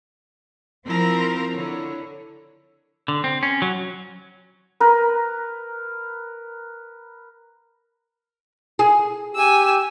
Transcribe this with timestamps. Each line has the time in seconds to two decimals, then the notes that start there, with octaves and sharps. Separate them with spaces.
0.86 F3 C4 E4 A#4 A#5
1.53 D3 E4 C#5
3.08 D3
3.24 C4
3.43 C#4
3.62 F#3
4.80 A#4 B4
8.79 G#4
9.35 G4 G#5 E6